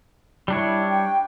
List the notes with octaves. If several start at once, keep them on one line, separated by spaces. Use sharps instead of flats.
G3 D4 E4 C#5
G5